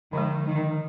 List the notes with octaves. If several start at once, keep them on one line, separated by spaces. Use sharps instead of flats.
D3 D#3 F3 G#3
D#3